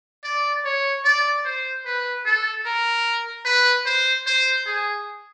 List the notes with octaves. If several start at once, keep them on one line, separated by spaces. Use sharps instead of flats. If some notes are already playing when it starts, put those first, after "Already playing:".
D5
C#5
D5
C5
B4
A4
A#4
B4
C5
C5
G#4